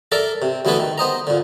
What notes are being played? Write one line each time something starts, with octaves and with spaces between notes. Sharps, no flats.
A4 A#4 D5 E5 A#5
C3
D2 E3 B3 E4 A4 B4
D#3
B3 C5 D#5 A#5
A#2 D3